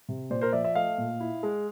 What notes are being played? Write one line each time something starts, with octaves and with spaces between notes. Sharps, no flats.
C3
A#2 C5 D5
A#4 C5
F3 D5 E5
D5 E5
A3 D#5 F5
A#2
E4
G#3